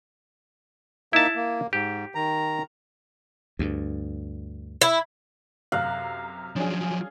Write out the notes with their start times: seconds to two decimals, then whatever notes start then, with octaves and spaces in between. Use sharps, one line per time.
1.13 A#3 D#4 E4 E5 A5
1.35 A#3
1.73 G#2 G4
2.15 D#3 A#5
3.59 D2 G2
4.81 E4
5.72 F#2 C3 F5 F#6
6.56 F3 F#3 C#4 D4 G#4